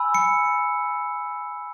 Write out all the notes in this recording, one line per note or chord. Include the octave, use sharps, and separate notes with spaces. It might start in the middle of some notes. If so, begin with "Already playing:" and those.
Already playing: G#5 B5 E6
C#7